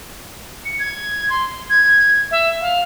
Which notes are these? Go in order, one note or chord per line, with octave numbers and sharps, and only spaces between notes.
C#7
G#6
C6
G#6
E5
F5